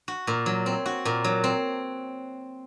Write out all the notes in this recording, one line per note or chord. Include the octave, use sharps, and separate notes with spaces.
F#4
A#2
F#3
C4
F#4
A#2
F#3
C4